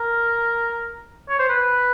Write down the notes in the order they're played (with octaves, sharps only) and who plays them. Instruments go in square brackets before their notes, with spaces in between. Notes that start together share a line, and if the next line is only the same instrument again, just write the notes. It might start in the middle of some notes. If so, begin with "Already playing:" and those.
Already playing: [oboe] A#4
C#5
C5
B4